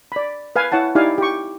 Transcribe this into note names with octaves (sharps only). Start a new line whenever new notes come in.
D5 B5
B4 F5 G#5
E4 C#5 F#5 A5
D#4 E4 G4 D5 F5 G#5
G4 C#6